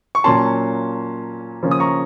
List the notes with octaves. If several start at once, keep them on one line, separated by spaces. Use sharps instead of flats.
C#6
A#2 F#3 A#3 C#4 A5 C6
C#3 F3 A#3 C#4
D#6
A#5 C#6